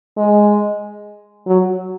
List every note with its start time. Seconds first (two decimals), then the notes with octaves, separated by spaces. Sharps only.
0.17 G#3
1.47 F#3